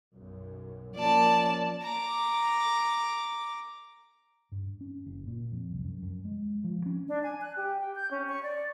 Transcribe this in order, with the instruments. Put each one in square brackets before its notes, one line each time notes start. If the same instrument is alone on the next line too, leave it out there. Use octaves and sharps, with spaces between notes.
[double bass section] B1 F#2
[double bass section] F3 A#3 C#4 [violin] D5 A5
[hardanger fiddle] A#5 D6
[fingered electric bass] G2
C#4
F#1
A#2
F2
C2
F#2
F#2
G#3
F3
C#4
[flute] D4
G#5
F#6
G4
G5
G6
C#4
C#6
D5